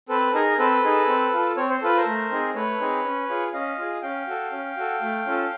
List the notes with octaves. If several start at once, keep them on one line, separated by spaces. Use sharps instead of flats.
C4 A4 B4
D#4 G#4 A#4
C4 A4 B4
D#4 G#4
C4
F4 A4
C4 C#5
C5
F4 A4 B4
A#4 C5
A3
C4 D#4 G#4
A3 B4 C#5
C4 D#4 G#4
C#4
F4 G#4
C#4 D#5 F5
F4 G#4
C#4 F5 G5
F#4 A4
C#4
F#4 A4
A3
C#4 F4 A4